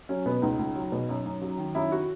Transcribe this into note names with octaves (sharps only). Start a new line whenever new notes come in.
F#3 C#4
B2 B3
C#2 D#4
C#2
F#3
B2
F#2
F#2
F#3
D#3
F#2 E4
F#4